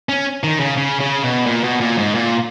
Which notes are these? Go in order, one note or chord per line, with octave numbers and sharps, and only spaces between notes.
C#4
D#3
C#3
C#3
C#3
B2
A#2
B2
A#2
G#2
A#2